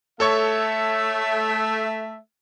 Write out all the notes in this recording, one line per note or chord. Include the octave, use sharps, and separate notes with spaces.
A3 A4 C#5 E5 C#6